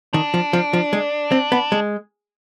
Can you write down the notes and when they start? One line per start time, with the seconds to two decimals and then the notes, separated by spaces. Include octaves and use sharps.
0.13 D#3 D4
0.34 F3
0.53 F3
0.73 F3
0.93 G#3
1.32 C4
1.52 B3
1.72 G#3